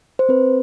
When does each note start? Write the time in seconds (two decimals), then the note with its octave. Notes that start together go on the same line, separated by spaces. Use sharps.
0.19 C5
0.29 C4 B4